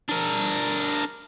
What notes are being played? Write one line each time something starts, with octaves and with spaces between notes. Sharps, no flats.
D4 A#4